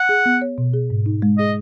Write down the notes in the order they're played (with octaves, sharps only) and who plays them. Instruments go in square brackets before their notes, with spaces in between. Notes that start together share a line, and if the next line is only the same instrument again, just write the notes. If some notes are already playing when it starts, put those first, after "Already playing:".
Already playing: [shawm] F#5
[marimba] G#4
B3
C#5
B2
G#4
G#2
D#4
G#3
[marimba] G#4 [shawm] D#5